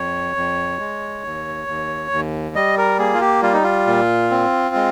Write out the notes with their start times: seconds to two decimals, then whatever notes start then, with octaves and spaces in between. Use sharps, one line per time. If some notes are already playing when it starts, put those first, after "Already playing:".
Already playing: F2 C#5
0.36 F2
0.79 G#3
1.24 D#2
1.67 D#2
2.11 D#2
2.55 G3 D#5
2.78 A#4
2.99 A#3 G#4
3.14 F4
3.21 G4
3.43 G3 F4
3.53 D#4
3.63 F4
3.87 A#2
4.30 C4
4.75 G#3